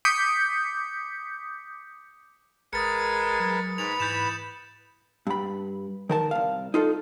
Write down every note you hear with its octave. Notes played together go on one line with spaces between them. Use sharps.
D6 D#6 G6 B6 C#7
A1 G#3 A#4 B4 D#6 A6 C#7
F#3
G#2 B4 B5 F7
G#2 E3 G6 E7
G2 B5
D#3 A#4 A5
C2 F5
D#4 F4 A4